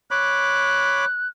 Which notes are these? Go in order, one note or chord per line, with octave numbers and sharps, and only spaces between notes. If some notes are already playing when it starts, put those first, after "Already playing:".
C#5 B5 D6 F#6